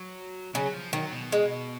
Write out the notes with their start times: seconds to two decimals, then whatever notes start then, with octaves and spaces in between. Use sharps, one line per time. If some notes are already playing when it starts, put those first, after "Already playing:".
Already playing: F#3
0.54 C#3 F#3
0.74 F3
0.93 D#3 F#3
1.12 B2
1.32 G#3